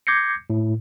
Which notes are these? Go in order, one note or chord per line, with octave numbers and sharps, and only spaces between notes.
D6 G6 G#6 A#6 C7 C#7
A2